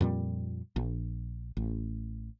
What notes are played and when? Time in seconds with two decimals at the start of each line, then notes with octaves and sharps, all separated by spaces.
0.01 F2 A#2 G3
0.76 A#1
1.57 A1